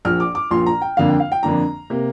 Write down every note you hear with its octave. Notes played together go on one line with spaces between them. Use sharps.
A#1 A#2 F3 F6
D6
D6
A#1 A#2 F3 C6
A#5
G5
F2 D3 A#3 D4 F5
G5
F5
G5
F2 D3 A#3 D4 A#5
C3 A#3